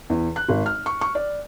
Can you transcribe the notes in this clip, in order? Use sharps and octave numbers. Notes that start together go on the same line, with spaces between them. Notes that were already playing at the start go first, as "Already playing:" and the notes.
E2
F#6
G#1
F6
C#6
C#6
D5